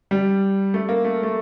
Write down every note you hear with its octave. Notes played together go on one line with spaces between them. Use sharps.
G3
A3
A#3
A3
A3